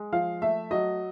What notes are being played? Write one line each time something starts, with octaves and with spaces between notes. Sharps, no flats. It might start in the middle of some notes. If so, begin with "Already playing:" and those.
Already playing: G#3
F3 F5
A3 E5
F#3 D#5